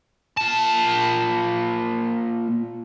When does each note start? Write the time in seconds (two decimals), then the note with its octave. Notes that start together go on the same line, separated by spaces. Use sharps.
0.37 A#2 A5